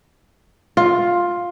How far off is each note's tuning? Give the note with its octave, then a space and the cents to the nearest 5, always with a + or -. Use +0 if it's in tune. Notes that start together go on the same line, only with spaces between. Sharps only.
F4 +10